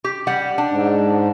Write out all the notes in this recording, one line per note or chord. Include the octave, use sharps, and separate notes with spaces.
G4
G3 F#5
D4
G#2